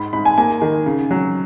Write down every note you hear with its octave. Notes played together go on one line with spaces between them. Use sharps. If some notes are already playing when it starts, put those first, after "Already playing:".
Already playing: G#2 B5
G#2 B5
G#5
A#3 G#5
D#3
C#3
F#3